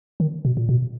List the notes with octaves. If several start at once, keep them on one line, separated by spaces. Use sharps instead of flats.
D#3
B2
A#2
B2